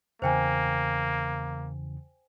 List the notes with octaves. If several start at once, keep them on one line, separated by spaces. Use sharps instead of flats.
E2 C#3 E3 A#3 C5 G5 G#5